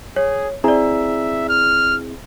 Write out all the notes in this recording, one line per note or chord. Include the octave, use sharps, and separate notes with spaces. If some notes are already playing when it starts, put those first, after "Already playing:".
G#4 C#5
C4 E4 G#4 D5 E5 A#5
F6